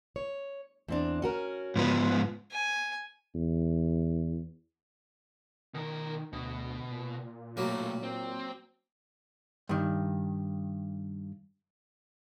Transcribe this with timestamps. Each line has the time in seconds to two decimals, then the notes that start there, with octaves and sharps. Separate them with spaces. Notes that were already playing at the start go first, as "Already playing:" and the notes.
0.16 C#5
0.88 E2 C4 D4
1.22 C#4 F#4 A#4
1.76 G#2 F3 B3
2.52 G#5
3.35 E2
5.75 B2 D#3 A#4
6.33 D2 B2
6.91 A#2
7.57 B2 F#3 A3 A#3
8.03 C4
9.69 G2 D#3